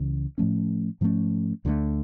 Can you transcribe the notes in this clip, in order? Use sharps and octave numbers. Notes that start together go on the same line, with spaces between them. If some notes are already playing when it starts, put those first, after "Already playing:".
Already playing: C#2 C#3 E3
A2 F3 A3 C#4
G#2 F3 A3 C#4
D2 D3 F3 A3